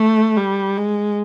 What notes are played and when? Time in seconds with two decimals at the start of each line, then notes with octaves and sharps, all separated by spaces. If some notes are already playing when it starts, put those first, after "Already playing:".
Already playing: A3
0.37 G3
0.77 G#3